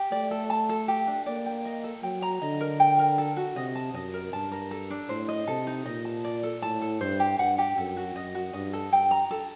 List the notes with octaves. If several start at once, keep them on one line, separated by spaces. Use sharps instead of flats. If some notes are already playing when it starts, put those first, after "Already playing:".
Already playing: G4
A3 D5
A4
A5
A4
G4
D4
A#3 D5
G5
D#5
A4
F#3 G5
A#5
D3 D#5
A#4
G5
A#4
A4
F#4
C3 D#5
A5
F#2 D#5
A#4
G2 A5
A#4
A4
D4
A2 C5
D#5
C3 A4
D#4
A#2 D#5
A5
D5
A4
A2 A5
A4
G2 C5
G4
G2 F#5
G4
F#2 A4
F#4
F#2 D#5
F#4
G2 D#5
A4
G2 G5
A#5
A4